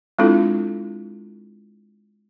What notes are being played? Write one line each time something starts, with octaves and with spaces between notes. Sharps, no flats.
G#3 C4 D4 E4 F4 A4